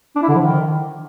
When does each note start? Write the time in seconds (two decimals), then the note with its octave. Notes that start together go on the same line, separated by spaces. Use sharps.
0.16 D4
0.22 E4
0.29 D3
0.35 F3
0.42 D#3